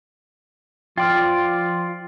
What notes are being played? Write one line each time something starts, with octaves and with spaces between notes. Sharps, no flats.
F3 F4 D5 G5 C6 F6